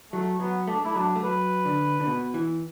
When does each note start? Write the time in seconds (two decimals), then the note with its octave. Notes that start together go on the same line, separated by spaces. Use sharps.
0.12 F#3 A3
0.40 F#3 B3
0.67 A3 D4
0.84 A3 E4
0.95 F#3 D4
1.16 A3
1.24 F#3 B4
1.65 D3
2.00 D3
2.06 B2
2.34 E3